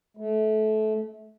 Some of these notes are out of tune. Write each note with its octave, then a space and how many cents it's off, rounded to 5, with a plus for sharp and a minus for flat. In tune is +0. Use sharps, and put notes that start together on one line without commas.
A3 -25